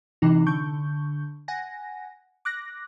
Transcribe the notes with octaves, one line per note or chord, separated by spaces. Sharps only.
C3 E3 D#4
D3 C#6 G6
F#5 G#5 A#6
D6 F#6 A#6